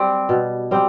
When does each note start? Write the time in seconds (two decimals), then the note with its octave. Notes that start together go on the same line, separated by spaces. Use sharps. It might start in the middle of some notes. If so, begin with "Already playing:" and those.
Already playing: G3 C4
0.29 B2
0.71 G3 C4